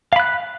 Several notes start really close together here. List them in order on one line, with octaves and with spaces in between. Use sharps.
F5 B5 F#6